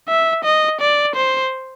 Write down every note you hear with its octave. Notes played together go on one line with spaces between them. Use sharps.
E5
D#5
D5
C5